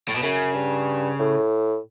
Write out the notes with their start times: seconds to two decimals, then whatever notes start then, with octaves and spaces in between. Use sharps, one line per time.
0.08 A2
0.16 B2
0.23 F#2 C#3
0.55 G2
1.19 A2